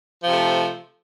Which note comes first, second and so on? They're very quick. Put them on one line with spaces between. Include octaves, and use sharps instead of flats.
F3 C3 A3